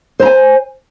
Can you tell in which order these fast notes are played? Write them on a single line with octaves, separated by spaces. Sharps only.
C5 A#5 G#5